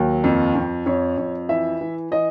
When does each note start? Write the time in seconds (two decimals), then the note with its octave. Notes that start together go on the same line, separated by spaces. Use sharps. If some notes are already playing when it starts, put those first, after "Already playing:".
Already playing: D#2 F#3
0.24 F2
0.55 F2
0.86 F2 C#5
1.18 F2
1.49 E3 E5
1.81 E3
2.11 E3 D#5